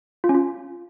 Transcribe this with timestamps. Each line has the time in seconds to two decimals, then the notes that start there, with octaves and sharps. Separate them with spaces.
0.24 F4
0.29 C#4
0.35 F4